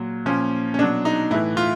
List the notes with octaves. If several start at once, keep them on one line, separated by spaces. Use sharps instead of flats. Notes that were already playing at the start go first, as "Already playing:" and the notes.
Already playing: A#2 F#3
A#2 F3 C#4
C#4
B2 F#3 D4
D#4
A2 E3 E4
F4